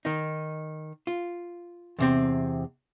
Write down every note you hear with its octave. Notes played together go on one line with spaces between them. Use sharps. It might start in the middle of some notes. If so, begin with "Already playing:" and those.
D#3 D#4
F4
E2 C3 C4